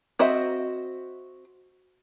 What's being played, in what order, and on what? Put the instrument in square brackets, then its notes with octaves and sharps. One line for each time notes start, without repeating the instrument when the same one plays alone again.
[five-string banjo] C4 F#4 C5 D#5 E5